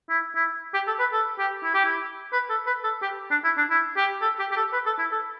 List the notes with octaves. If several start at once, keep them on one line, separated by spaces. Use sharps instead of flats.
E4
E4
G4
A4
B4
A4
G4
E4
G4
E4
B4
A4
B4
A4
G4
D4
E4
D4
E4
G4
A4
G4
G4
A4
B4
A4
E4
A4